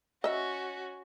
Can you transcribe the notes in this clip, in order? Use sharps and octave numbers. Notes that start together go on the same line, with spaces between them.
C#4 F#4 D#5 E5